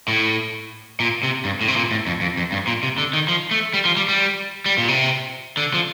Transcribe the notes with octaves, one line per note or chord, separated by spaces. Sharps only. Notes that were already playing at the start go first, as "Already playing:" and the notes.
A2
A#2
C3
G2
A2
C3
A#2
A2
F2
F2
F2
G2
A#2
C3
D3
D#3
F3
A3
G3
F3
G3
G3
G3
A#2
C3
D3
F3